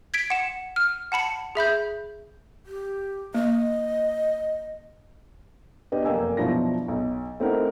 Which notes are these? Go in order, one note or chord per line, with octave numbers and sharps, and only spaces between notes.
G#6 B6 D7
F#5 E7
F6
F#5 A5 B5 C#7
G#4 E5 B5 G6
G4
A#3 D#5
B3 D4 G4 D#5
F1 F#2 A#3 G5 G#5 E6
B2 F3 F#3 D4 E4 A#6
B1
A3 C4 D#4 E4 A#4 F#5